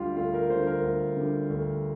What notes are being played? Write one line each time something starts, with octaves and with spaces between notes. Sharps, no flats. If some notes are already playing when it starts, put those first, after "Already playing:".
Already playing: D2 D3 G3 F4 G4
D2 F4
A#4
D3 G3 C5
A#4
D2
D3 G3
D2